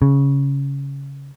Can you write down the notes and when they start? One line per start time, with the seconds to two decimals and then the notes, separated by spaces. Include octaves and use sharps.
0.02 C#3